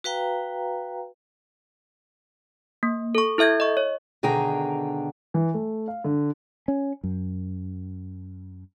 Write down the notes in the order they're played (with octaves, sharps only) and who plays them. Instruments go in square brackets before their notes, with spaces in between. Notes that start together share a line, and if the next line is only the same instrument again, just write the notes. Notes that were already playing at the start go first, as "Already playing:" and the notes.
[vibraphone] F#4 B4 F5 G5 A#5
[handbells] A#3
A4 C#6
E4 A4 E5 G6 G#6
D#5 C#6
C#5
[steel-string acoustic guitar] B2 D3 D#3 G#4 G5 A#5
[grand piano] E3
A3
F5
D3
[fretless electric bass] C#4
F#2